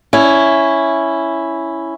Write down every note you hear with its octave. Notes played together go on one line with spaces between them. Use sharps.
C#4 E4